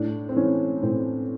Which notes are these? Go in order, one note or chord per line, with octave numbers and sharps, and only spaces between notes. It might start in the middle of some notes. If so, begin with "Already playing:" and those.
Already playing: A2 D4
C4
E3 C#4
A2 C4